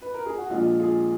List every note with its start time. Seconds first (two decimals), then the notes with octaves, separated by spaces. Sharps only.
0.02 B4
0.14 A#4
0.26 G#4
0.38 F#4
0.50 A#1 A#2 F3 G#3 F4
0.80 F4 G#4